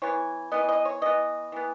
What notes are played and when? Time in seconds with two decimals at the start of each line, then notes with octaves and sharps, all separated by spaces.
0.02 E3 B3 C#5
0.52 E3 B3 D#5
0.69 D#5
0.85 C#5
1.02 E3 B3 D#5
1.52 E3 B3